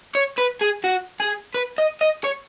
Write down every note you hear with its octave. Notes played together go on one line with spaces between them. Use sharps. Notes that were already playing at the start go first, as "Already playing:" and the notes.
C#5
B4
G#4
F#4
G#4
B4
D#5
D#5
C#5